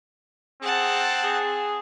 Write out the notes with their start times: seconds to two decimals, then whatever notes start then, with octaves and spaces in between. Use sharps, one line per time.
0.63 C4 G#4 F#5 A5
1.23 G#4